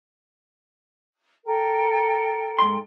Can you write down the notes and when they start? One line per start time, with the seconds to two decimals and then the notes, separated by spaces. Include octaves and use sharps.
1.46 A4 A#4 G5
2.59 G#2 C6